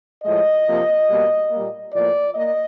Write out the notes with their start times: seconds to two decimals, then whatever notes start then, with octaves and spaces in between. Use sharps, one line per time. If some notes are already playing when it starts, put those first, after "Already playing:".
0.23 A2 F3 G#3 D#5
0.66 C3 F3 A#3
1.09 B2 G3 A#3
1.50 A#2 G3 A#3
1.92 A2 F3 A#3 D5
2.35 A#3 D#5